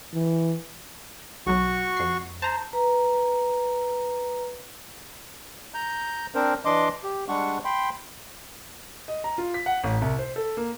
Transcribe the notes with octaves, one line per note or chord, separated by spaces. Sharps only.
E3
B1 F#3 F#4 C#6
F2 C7
C5 A5 A#5
B4 A#5
A#5 G6
C4 D4 A#4 C5
E3 D4 D#5 C6 D6
G4
G3 G#3 D4 F#5 C#6
G5 B5 C6
D#5
A#5
F4
B6
F#5
A1
C2
C5
A4
A#3